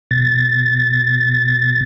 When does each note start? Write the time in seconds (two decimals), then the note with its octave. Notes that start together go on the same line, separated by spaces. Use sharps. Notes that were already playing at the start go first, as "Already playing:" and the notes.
0.11 B2 A6